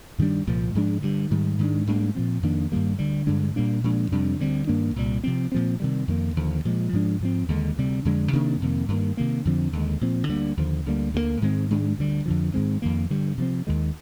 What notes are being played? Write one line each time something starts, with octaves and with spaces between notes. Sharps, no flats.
G2 D#3 G3 D4
C2 A#2 F3 A#3
G#2 F3 G#3 D4
G2 D3 G3
G#2 D#3 G3
G#2 D#3 G#3 D4
G#2 G3 A#3 D4
A#2 F3 C4
F2 D#3 A#3 D4
G2 D#3 G3 A#3
D2 D3 G3
G2 D3 G#3 D4
A#2 G3 A#3 D4
A#2 F3 G#3 D4
F2 C3 G3 D4
D2 D3 G3 C4
G2 D#3 A#3 D4
C2 A#2 G3
C3 F3 C4
A#2 F3 C4
C3 D#3 G3
F2 D#3 A#3
D#2 D3 F3
A#2 F3 G#3
G#2 F3 G#3 D4
G#2 F3 C4
D#2 D3 G#3
D2 C3 G3
F2 D3 G#3 D4
C3 D#3 A#3 D4
F2 C3 D#3 A#3
G2 D#3 A#3
C3 D#3 A#3
F2 D3 F3 C4
D#2 D3 G#3
A#2 F3 C4
D2 D3 G3 A#3
D#2 D3 F3
D2 D3 G3 A#3
D2 D3 F3 A#3
G#2 D#3 G#3 C4
G#2 D#3 G#3 D4
D2 D3 G3
F2 D3 F3
G#2 D#3 G#3 C4
F2 D#3 A#3
G2 D3 G3
C3 F3 C4
D#2 D#3 G#3